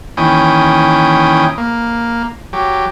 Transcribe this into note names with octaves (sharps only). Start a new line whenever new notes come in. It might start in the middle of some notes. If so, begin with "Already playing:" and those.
D#2 E3 C#4 G5 D#6
A#3
F#3 G4